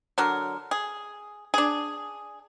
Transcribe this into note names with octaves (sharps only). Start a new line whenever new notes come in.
D3 F#3 A#4
G#4
D4 G#4